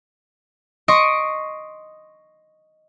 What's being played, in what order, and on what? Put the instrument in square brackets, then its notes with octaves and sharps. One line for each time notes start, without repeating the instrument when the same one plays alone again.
[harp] D#5 C6 C#6 D#6 C#7 D7